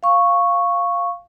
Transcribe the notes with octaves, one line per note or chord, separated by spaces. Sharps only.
F5 C#6